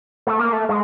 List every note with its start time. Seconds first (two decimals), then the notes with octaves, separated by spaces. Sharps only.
0.27 A3
0.39 A#3
0.53 A3
0.69 G#3